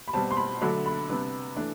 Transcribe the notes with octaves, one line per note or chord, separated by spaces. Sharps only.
B5
B2 G3 C4 A5
C6
B5
D3 F#3 A3 D4 B5
B5
C3 G3 B3 D4
E3 A3 D4